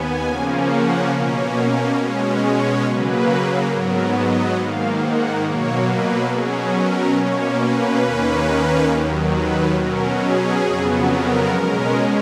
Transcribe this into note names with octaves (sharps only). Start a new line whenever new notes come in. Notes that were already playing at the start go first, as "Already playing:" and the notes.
Already playing: D#2 B3 G#5
C#3 F3 A#3 C#4
F#5
B2 A#3 C#4
B2 G#3 C#4
C#5
C#3 F#3 A#3 B4
G#2 F#3 B3 A#4
D#5
G#2 D#3 A#3 F5
F#5
B2 F#3 A#3 C#5
B4
B2 F#3 C#4 G#4
A#4
B2 A#3 C#4 C#5
B4
D#2 D#3 A#3 C#4
D#2 D#3 F#3
B4
B2 F#3 C#4 A#4
G#4
F2 C#3 F#3 B3
A#4
B2 G#3 C#4